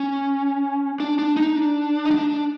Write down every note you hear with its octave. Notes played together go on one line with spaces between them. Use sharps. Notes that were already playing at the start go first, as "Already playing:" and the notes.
Already playing: C#4
D4
D4
D#4
D4
D#4
D4